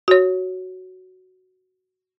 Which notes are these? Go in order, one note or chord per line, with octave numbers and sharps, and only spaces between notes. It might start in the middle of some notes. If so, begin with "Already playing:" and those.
F#4 C#5